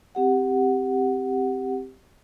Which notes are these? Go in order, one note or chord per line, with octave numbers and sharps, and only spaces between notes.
C4 G4 F#5